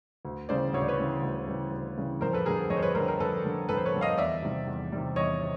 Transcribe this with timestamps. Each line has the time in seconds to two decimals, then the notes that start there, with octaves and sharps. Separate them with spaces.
0.25 D2
0.49 C#3 E3 G3 C5 D5
0.73 D2 C#5
0.81 D5
0.88 B4 C#5
0.98 C#3 E3 G3
1.23 D2
1.47 C#3 E3 G3
1.72 D2
1.97 C#3 E3 G3
2.21 F2 A#4 C5
2.33 A4 B4
2.46 D3 G3 G#4 A#4
2.70 F2 C#5 D#5
2.77 C5
2.82 B4 C#5
2.95 D3 G3 A#4 C5
3.08 A#4 C5
3.20 F2 A4 B4
3.45 D3 G3
3.69 F2 A4 B4
3.77 C5
3.86 B4 C#5
3.94 D3 G3
4.01 D#5 F5
4.18 E2 D5 E5
4.42 C3 D#3 G3
4.67 E2
4.92 C3 D#3 G3
5.16 E2 C#5 D#5
5.41 C3